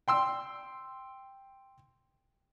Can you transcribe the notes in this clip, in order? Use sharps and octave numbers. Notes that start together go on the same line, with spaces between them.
G5 C6 E6